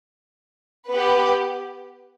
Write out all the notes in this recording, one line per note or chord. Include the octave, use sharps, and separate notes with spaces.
B3 G4 B4